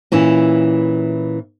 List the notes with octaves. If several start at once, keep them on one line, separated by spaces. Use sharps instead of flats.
A#2 E3 C#4 E4